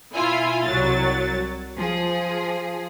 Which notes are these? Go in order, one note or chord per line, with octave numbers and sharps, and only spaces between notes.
B2 E4 F4 G#5
C2 F#3 A6
F3 G#4